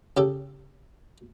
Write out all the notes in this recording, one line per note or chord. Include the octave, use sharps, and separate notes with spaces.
C#3 G4 A4